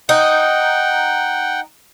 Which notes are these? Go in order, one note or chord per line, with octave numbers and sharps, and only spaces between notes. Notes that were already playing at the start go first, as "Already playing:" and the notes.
D#4 F#5 G5